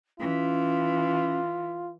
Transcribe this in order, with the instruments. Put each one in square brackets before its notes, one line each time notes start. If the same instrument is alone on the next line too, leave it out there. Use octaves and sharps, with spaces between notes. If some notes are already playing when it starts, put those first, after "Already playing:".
[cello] E3 [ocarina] C#4 [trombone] F4